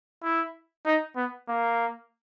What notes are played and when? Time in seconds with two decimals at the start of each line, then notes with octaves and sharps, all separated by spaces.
0.23 E4
0.86 D#4
1.16 B3
1.49 A#3